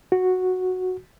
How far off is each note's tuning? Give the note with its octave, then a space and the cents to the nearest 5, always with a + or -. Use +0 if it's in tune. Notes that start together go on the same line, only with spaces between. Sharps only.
F#4 -5